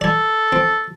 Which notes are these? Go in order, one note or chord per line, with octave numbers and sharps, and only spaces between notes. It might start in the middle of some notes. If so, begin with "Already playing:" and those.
A4 D5 G#5
C4